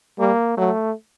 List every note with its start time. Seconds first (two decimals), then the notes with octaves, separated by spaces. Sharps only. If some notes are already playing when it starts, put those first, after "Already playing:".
0.19 G3 A#3
0.57 F#3 A3